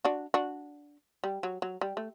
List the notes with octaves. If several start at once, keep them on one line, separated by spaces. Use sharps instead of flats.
D4 F#4
D4 F#4
G3
F#3
F#3
G3
A3